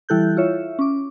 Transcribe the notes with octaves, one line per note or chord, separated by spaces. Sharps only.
E3 G3 E4 A4 F#6 G6
E4 F4 C#5 E5
C#4 D6